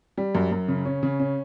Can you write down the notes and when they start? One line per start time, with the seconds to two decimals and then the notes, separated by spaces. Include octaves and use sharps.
0.18 G3
0.35 F#2
0.52 F#2
0.68 C#3
0.85 C#4
1.03 C#3
1.20 C#4